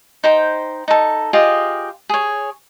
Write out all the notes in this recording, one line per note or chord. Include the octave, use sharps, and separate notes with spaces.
D#4 C5 G5
D#4 A4
F4 G4 G#4 D#5
G#4 C#5